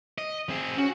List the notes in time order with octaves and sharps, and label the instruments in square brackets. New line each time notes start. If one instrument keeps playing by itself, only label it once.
[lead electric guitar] D#5
C4 G#4
[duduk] C#4 [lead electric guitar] F#4